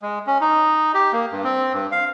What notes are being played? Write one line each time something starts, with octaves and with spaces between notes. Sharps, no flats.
G#3
C#4
D#4
G4
A#3
G2
C4
G2
F5